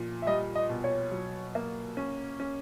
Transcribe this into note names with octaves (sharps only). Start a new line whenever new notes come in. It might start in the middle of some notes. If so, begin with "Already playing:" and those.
Already playing: A#2 F3
E5
G3 D#5
D#5
B2
C#5
F#3
A#3
C#4
C#4